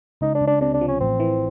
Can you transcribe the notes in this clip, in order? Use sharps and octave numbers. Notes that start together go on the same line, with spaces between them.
C#2 D#4
D4
C#2
D4
C3 D4
D4
F3
C#4
A1 C4
E3